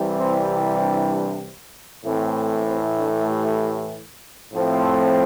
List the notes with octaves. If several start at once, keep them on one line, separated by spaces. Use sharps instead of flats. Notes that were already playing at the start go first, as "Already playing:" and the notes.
Already playing: C2 C3 E3 G3
C4
D4
A2 E3 A3 C4
C4
D4
G4
A2 F3 A3 C4